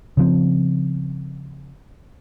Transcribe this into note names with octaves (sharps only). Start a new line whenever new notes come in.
C#3 F3 C4